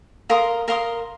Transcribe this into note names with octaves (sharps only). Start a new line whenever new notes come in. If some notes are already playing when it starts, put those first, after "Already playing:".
A#4 F5 C6 D#6
A#4 F5 C6 D#6